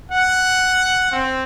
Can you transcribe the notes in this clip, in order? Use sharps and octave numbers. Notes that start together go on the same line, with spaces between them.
F#5
C4